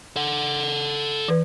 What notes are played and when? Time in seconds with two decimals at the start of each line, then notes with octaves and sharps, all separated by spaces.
0.16 A4 F#5
1.28 E3 B4